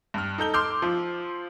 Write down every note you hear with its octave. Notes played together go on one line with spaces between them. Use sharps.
G2 F6
D#4 A4 G6 G7
C6 D6 E6 F6 G6
F3 F4